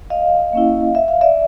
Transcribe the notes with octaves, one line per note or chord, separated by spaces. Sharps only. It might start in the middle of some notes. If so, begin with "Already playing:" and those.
D#5 F5
A#3 C#4 E4
E5
F5
D5 E5